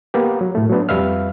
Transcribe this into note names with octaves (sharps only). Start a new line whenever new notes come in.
A#3 B3 G4
F#3
A2 A3
F#3 B3 D4
F2 G3 B4 E5 F5 F6